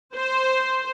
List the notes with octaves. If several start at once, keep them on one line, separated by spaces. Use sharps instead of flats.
C5